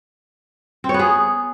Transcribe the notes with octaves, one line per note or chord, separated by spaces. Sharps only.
C4
C#5
B3
G#4